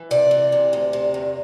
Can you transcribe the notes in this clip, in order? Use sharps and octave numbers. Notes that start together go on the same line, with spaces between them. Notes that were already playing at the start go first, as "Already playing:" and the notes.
Already playing: E3
C3 D5
E3
C3
D2
C3
E2